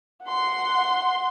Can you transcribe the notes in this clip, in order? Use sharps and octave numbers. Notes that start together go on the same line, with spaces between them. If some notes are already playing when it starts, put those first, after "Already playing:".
F#5 C6